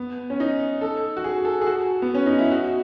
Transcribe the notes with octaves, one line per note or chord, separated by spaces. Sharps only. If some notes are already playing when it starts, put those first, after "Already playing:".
Already playing: B3
C#4
D#4
A4
F#4
G#4
A4
G#4
F#4
B3
C#4
D#4
E4
F#4